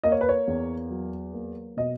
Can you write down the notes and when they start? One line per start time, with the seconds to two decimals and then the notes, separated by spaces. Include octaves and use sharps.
0.04 A#3 D#5
0.12 C#5
0.21 B4
0.29 C#5
0.47 E2
0.90 F#3
1.33 A#3
1.77 B2 D#5